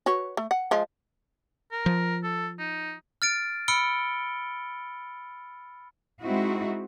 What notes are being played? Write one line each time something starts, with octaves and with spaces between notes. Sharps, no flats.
F#4 B4 C#5
A3
F#5
F3 G#3
A#4
F3
A4
D#4
F6 A6 D7
B5 E6 F6 C#7 D7 G7
G#3 C4 D#4 E4 F#4